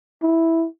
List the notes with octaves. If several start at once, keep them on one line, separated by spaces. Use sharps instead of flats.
E4